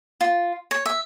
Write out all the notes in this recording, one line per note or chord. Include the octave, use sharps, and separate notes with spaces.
F4
C#5
E5